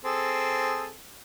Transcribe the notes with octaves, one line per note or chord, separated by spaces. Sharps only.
C4 G#4 A4